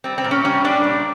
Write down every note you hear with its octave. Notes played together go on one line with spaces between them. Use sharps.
G3 C4
C4
A#2
C#4
G3 C#4
G3 D4
A#2